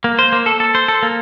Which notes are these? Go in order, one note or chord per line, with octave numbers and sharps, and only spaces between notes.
A#3
C5
A#3
A4
A4
C5
A4
A#3